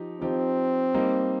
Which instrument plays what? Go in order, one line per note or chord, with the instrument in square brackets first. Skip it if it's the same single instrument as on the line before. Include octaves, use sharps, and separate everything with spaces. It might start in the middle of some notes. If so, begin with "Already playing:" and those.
Already playing: [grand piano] F3 D#4 G4
[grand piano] F3 D#4 G4 [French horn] C4
[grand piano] G3 A#3 D#4